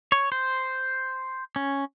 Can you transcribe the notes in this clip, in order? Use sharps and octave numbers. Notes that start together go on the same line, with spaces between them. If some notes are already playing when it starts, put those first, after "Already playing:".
C#5
C5
C#4